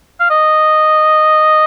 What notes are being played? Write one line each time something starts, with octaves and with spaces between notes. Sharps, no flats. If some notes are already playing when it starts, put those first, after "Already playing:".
F5
D#5